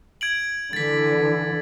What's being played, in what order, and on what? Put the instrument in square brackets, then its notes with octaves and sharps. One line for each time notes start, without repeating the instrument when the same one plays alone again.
[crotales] G#6 D7 F#7
[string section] D3 E3 [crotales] A6 B6